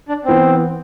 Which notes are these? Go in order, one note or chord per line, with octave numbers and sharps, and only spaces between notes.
D4
E3 B3 C4